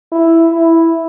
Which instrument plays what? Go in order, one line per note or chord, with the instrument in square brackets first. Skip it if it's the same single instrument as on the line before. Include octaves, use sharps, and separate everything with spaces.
[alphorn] E4
E4